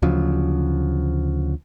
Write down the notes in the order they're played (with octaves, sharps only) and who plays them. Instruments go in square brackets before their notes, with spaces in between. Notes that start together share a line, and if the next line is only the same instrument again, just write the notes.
[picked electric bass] D2 C#3 F3 F#3